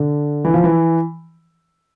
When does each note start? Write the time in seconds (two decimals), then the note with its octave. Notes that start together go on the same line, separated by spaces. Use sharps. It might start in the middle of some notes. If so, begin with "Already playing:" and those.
Already playing: D3
0.45 E3
0.54 F3
0.64 E3